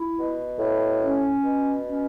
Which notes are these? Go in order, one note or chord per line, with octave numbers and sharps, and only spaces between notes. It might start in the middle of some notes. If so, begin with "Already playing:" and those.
Already playing: E4
B2
A2
C#4
B2
C#4